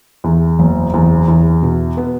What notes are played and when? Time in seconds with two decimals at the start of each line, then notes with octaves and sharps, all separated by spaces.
0.24 E2
0.59 F#1
0.94 E2
1.28 E2
1.63 B2
1.97 B3